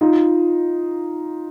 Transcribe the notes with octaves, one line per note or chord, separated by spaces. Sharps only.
D#4 F4